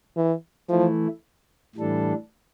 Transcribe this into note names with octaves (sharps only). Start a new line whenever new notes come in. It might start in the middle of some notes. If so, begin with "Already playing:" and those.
E3
E3 F3 A3 E4
A2 E3 G3 D4 A4